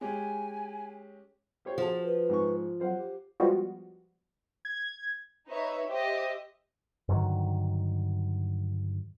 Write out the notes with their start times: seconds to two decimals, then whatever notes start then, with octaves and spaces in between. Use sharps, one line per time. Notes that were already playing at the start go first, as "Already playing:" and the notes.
0.01 G#3 C#4 G4 G#5
1.65 G4 C5 C#5
1.78 F3 F#4 G#4 A5
2.04 B4
2.29 G#2 C#6
2.80 F#3 F4 C5 F#5
2.97 G4
3.40 F3 G3 G#3 B3 F4 F#4
4.65 G#6
5.47 D#4 B4 C#5 E5
5.86 G4 C5 D#5 E5
7.09 G2 D3 D#3 F#3